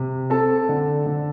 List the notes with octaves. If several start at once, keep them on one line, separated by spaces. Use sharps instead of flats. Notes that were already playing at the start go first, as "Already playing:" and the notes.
Already playing: C3
C4 A4 A5
D3
D3